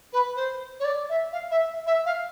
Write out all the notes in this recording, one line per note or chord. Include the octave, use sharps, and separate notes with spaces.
B4
C5
C#5
D5
E5
F5
E5
E5
F5